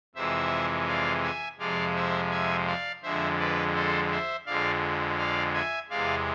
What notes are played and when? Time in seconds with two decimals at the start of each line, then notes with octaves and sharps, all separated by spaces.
0.15 F2 C3 E3 G#3 C5 E5
0.87 D5 F5
1.23 E5 G#5
1.59 F2 C3 F3 G#3 D5 F5
1.95 C5 E5
2.31 E5 G#5
2.67 D5 F5
3.03 F2 D3 G#3 C5 E5
3.38 B4 D5
3.74 A4 C5
4.11 C5 E5
4.46 F2 D3 G#3 D5 F5
5.18 D5 F5
5.54 E5 G#5
5.90 E2 C3 G#3 D5 F5